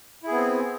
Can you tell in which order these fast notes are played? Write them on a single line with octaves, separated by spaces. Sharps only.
E4 G#4 B3 C4